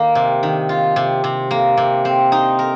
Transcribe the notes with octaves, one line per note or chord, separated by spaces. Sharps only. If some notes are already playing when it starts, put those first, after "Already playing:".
Already playing: D#3 A#3
C3
D#3
F4
C3
C3
A#3
C3
C4
D#4
A#4